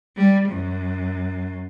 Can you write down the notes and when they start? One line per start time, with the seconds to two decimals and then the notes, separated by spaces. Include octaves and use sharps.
0.16 G3
0.48 F#2